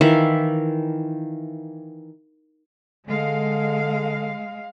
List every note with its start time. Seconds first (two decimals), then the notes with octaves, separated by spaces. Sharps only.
0.01 D#3 E3 E5 F5
3.07 D3 G#3 F5